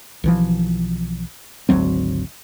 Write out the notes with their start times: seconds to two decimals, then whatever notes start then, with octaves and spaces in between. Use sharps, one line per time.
0.24 B1 E3 F3
1.69 G#1 D2 F#3 C4